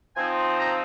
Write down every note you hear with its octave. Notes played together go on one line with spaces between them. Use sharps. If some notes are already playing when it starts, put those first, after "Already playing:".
F3 C4 D#4 G#5
A#5